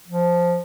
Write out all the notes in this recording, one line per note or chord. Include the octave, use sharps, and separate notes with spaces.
F3